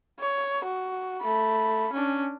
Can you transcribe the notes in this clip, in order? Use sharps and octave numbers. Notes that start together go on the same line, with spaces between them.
C#5
F#4
A3 B5
C#4 D4